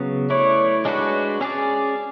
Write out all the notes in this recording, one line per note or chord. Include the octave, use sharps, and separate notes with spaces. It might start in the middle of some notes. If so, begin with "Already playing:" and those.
Already playing: C#3 F#3 B3
A3 E4 B4 C#5 D5
G#3 D4 F#4 B4
C#4 G#4 D5